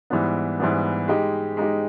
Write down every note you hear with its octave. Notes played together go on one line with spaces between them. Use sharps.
G#2 E3 G3 B3
G#2 E3 G3 B3
G#3 D#4 G4
G#3 D#4 G4